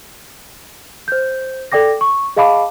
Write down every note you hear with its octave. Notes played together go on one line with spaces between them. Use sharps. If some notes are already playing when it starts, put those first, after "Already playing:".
C5 G6
A4 D5 G5 D6 A#6
C#6
G#4 D#5 F5 A5 B5 D6